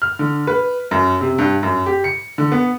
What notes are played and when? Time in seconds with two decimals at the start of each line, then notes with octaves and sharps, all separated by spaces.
0.02 F6
0.19 D3
0.47 B4
0.91 F#2
1.21 C3
1.38 G2
1.63 F#2
1.86 G4
2.04 C#7
2.38 D3
2.52 B3